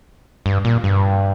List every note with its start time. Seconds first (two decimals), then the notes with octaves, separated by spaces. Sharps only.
0.46 G2
0.65 A#2
0.84 G2